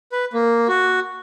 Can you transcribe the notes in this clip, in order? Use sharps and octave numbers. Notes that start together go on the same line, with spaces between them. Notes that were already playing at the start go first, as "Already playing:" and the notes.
B4
A#3
F#4